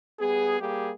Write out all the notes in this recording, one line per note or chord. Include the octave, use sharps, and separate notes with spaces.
G3 B3 G#4
G3 A#3 G4 G#4